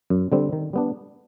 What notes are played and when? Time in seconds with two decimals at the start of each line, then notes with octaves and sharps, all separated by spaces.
0.10 F#2
0.32 D3 G3 C4
0.53 D#3
0.73 G3 B3 D4